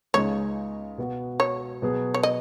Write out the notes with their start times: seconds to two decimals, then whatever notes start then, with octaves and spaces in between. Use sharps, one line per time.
0.14 C#2 C#3 G#3 D#4 C#5
0.98 B2 B3 F#4
1.40 C#5
1.82 B2 F#3 B3 G#4
2.14 C#5
2.23 D#5